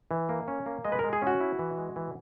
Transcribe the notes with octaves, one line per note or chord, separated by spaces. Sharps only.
E3
A#3
C#4
A#3
G#3 D#5
B4
A#4
G#3
G#4
C#4 F#4
E4
E3
G#3
E3